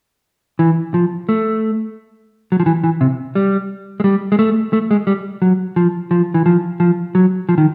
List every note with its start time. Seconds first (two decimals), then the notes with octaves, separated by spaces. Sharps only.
0.59 E3
0.94 F3
1.29 A3
2.52 F#3
2.60 F3
2.66 E3
2.84 E3
3.01 C3
3.35 G3
4.00 G#3
4.04 G3
4.32 G#3
4.39 A3
4.73 A3
4.91 G#3
5.07 G3
5.42 F#3
5.76 F3
6.11 F3
6.34 E3
6.46 F3
6.80 F3
7.15 F#3
7.49 F3
7.58 D#3